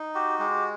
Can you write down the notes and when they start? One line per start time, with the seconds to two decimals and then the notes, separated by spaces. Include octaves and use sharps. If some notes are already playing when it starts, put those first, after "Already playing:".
Already playing: D#4
0.14 F#4 G4
0.39 G#3 G4